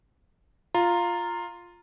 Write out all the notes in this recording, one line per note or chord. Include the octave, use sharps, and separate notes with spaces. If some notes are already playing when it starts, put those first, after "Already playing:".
F4 A#5